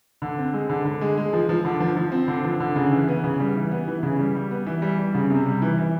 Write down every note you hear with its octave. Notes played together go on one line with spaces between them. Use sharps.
D3
C4
G#3
D3
D3
G#3
G#3
F3
F3
D3
F3
F3
C4
D3
F3
D3
C#3
E3
B3
C#3
G3
E3
B3
E3
C#3
G3
G3
B3
E3
G3
G3
C#3
C3
G3
E3
E3